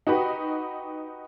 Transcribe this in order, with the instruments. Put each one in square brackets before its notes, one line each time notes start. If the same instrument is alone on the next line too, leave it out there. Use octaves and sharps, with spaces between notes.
[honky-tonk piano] D#4 F#4 G4 B4